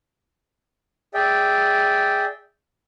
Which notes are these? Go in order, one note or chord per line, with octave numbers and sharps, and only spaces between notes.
G#4 D5 E5 G5